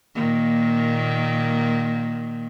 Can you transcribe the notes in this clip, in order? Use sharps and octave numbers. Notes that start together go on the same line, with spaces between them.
A#2 D#3 A#3